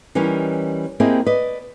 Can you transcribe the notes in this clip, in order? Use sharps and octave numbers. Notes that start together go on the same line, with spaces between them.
E3 G3 C#4 D#4 A#4
A#3 C4 E4 G4 G#4 D#5
B4 D5 D#5